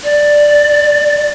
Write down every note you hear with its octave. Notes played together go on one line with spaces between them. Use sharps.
D5